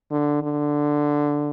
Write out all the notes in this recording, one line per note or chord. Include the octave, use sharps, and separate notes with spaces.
D3
D3